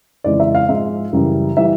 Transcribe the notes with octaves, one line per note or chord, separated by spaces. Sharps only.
F2 C#3 E3 G#3 D5
E5
F5
G#2 F3 G#3 E5
F#2 C#3 E3 G3
E3 G3 E5